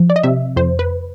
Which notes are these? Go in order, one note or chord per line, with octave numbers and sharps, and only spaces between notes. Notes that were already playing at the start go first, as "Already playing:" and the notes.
Already playing: F3
D5
D#5
C3 E5
F2 C5
B4